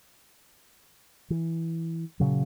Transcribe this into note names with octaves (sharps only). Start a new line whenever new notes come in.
E3
A#2 C#3 F#3